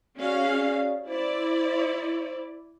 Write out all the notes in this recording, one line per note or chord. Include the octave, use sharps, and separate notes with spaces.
C#4 F#4 G#4 D5 F5
E4 C5 D5